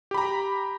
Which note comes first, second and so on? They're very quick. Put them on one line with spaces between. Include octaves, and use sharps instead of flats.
G4 B5 A#5